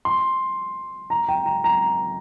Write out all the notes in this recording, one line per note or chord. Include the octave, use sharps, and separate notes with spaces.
C6
A#5
G5
A#5
A#5